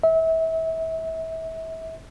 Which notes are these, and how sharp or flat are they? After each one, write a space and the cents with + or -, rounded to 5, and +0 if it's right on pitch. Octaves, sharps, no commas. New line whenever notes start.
E5 -30